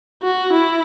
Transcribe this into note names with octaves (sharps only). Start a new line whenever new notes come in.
F#4
E4